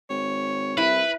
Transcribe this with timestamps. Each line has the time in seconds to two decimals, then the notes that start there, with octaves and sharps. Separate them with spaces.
0.10 G#1 C#5
0.78 C2 E4 B4